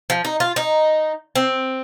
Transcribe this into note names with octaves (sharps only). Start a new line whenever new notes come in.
F3
D#4
F4
D#4
C4